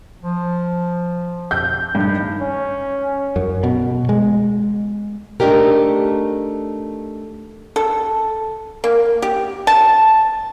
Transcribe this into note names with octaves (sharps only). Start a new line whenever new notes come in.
F3
G6
G2 D#3
C#4
F#2
B2
G#3
A3 D4 D#4 G4 A#4
A4
A#3
G4
A5